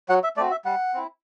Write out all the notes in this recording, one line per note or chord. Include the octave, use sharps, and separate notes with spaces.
F#3 F#5
E5
A3 C4 F#4 D5
E5
G3 F#5
C4 E4